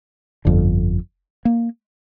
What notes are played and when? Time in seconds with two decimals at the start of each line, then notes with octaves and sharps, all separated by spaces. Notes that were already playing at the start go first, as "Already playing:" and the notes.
0.45 G1 F2 D3
1.45 A#3